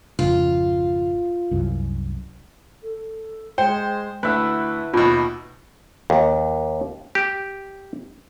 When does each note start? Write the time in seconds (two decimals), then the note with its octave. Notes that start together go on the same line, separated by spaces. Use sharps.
0.19 G#1 F2 C#3 F4
1.51 C2 F#2
2.82 A4
3.58 G#3 C5 G5
4.23 D2 E4 B4 E5 F#5 F#6
4.94 D#2 B2 F4
6.10 D#2
7.15 G4